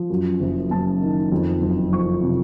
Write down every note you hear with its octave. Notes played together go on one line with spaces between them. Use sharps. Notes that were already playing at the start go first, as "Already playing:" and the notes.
Already playing: F3
F#2
F#1
F#1 A5
D#3
F2
F#1
F3 C#6
C3